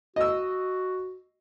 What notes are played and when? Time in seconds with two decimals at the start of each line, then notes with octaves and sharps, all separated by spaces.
0.16 F#4 D#5 E6